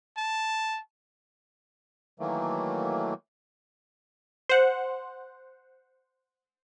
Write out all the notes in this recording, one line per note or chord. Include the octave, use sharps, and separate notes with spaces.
A5
D#3 E3 F#3 A3 A#3
C5 F#5